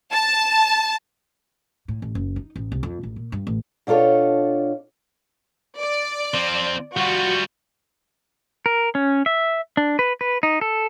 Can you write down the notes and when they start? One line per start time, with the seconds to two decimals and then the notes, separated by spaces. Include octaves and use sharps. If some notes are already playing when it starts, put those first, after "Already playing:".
0.12 A5
1.88 A2
2.02 A1
2.15 F#1
2.36 D#4
2.56 A1
2.72 C2
2.83 F2
3.03 A1
3.16 A#2
3.32 G2
3.47 A1
3.87 B2 D4 F4 A4 C#5
5.78 D5
6.34 F3 C4
6.97 G3 F4 F#4
8.66 A#4
8.95 C#4
9.26 E5
9.77 D4
9.99 B4
10.21 B4
10.43 D#4
10.61 A4